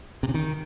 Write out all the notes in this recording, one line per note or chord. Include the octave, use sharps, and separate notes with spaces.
C3
C#3
D#3